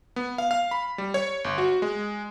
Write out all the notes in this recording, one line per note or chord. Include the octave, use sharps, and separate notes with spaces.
B3
F5
F5
B5
G3
C#5
G1
F#4
G#3